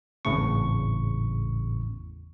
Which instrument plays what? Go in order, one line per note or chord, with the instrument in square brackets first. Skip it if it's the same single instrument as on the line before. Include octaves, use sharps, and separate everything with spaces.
[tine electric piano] G#1 E2 A2 C#3 C#6